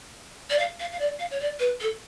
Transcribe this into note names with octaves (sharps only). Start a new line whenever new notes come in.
D5
F5
F5
F5
D5
F5
C#5
D5
B4
A4